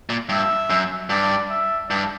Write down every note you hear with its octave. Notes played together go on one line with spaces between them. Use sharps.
A#2
G2 E5
F#2
G2 D5
E5
G2 D5